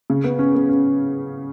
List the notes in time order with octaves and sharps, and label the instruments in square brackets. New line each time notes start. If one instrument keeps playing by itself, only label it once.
[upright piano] C#3
B3
C#4
B3
C#4